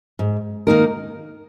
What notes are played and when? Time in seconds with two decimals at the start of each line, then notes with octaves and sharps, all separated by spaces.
0.19 G#2
0.67 D#3 A#3 D#4 A#4